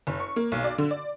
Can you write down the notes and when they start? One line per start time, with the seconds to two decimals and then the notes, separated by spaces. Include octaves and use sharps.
0.07 F#1
0.20 C#6
0.36 A#3
0.52 B1
0.64 D5
0.78 D3
0.91 D5